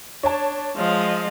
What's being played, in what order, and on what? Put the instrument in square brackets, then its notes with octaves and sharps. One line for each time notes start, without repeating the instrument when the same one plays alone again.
[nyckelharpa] D4 [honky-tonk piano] C#5 A5
[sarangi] F3 [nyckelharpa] G#3 [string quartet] D#5 F5